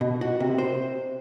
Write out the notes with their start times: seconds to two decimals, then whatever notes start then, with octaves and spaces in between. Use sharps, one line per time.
0.01 B2
0.21 F#4
0.40 C3
0.58 C5